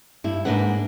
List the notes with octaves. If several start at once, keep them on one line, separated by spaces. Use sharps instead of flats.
G2 E4
G#2 D3 A#3 D4 B4 F#5